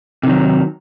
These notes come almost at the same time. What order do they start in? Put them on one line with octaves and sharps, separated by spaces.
C3 D#3 F#3